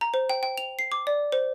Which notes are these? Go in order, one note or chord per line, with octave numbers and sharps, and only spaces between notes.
A#5
C5
G5
G5
F7
C7
D6
D5
C5